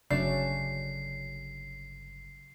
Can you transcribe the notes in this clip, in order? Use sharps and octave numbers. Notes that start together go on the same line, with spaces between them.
G1 C#3 F#3 A3 C#4 D4 D5 C7